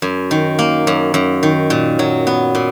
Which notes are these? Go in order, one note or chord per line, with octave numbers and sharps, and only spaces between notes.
F#2
D#3
A#3
F#2
F#2
D#3
A#2
F#3
B3
A#2